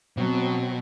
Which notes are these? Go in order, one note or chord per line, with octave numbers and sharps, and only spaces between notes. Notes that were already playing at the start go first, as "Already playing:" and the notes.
B2 F#3 C4